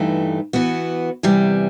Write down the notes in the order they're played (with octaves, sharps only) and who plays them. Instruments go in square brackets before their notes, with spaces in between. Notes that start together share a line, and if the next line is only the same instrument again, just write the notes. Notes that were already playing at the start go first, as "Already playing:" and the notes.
Already playing: [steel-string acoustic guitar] G2 E3 A3 D#4 G4
E3 B3 F#4
E2 C3 E3 G3